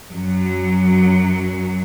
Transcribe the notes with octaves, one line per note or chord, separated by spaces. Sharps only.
F#2 F#3